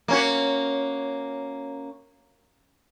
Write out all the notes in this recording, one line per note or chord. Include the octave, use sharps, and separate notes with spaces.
A#3 C#4 F#4